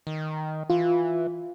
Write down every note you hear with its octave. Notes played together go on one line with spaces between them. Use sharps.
D#3
E3 F4